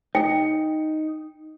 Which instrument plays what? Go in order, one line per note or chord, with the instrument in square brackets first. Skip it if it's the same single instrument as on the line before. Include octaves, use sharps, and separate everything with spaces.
[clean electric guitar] D#4 [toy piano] G5